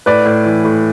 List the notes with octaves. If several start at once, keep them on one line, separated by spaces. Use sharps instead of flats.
A2 B4 D5
A2
E3
A2